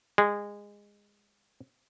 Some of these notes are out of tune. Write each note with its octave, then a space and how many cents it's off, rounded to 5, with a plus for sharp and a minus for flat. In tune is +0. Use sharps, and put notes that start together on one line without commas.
G#3 -20